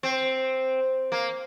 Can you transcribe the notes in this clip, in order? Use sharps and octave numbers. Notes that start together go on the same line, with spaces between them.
C4
A#3